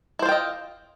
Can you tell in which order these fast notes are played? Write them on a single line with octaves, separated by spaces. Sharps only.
E4 C5 F4 G5 D#5